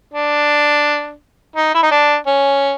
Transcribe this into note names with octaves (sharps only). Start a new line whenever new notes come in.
D4
D#4
E4
D#4
D4
C#4